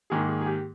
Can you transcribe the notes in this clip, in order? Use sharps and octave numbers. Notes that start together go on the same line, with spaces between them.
G#2 D#3 A#3 G#4
G#4
G#4
G4